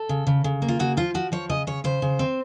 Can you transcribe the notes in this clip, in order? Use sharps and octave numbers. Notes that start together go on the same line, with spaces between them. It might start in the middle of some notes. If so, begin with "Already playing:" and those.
Already playing: A4
C#3
C#3
C#3
A#3
F4
C#3 F#4
F3 F4
F3 F#4
F3 C#5
C#3 D#5
C#3 C#5
C#3 C5
C#3
C4